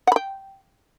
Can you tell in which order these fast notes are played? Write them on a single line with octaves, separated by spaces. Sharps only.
F#5 B5 G5